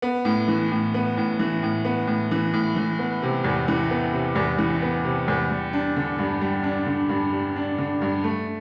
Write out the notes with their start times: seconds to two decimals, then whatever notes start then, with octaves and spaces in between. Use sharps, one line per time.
0.02 B3
0.25 A2
0.48 E3
0.71 A2
0.94 B3
1.17 A2
1.39 E3
1.63 A2
1.85 B3
2.07 A2
2.31 E3
2.53 A2
2.76 E3
2.99 B3
3.23 C3
3.44 E2
3.68 E3
3.91 B3
4.13 C3
4.35 E2
4.58 E3
4.82 B3
5.05 C3
5.28 E2
5.50 G3
5.73 D4
5.96 D3
6.19 G2
6.41 G3
6.64 D4
6.86 D3
7.09 G2
7.33 G3
7.56 D4
7.78 D3
8.02 G2
8.24 A3